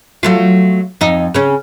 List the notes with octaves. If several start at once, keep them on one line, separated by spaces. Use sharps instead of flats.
F#3 A3 F4
F2 D#4
C#3 C#4